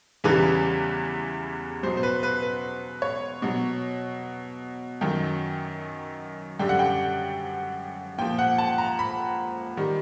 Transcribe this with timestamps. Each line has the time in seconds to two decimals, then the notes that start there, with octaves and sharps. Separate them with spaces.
0.24 E2 C#3 E3 G3 B4
1.83 B2 F#3 C5
1.97 C5
2.03 B4
2.23 B4
2.42 B4
3.02 C#5
3.42 B2 F#3
5.01 F#2 D#3 F#3 G5
6.59 F#2 D3 G3 G5
6.69 F#5
6.79 G5
8.18 A#2 F3 G5
8.39 F#5
8.58 A5
8.78 A#5
8.99 B5
9.77 D#3 G3